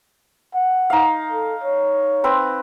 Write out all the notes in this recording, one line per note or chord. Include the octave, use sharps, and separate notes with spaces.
F#5
D#4 F5
A4
C#5
C4 B4